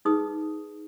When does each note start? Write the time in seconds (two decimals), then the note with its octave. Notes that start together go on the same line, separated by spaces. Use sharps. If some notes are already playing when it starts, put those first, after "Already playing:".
0.05 D#4 G#4 B4 D#6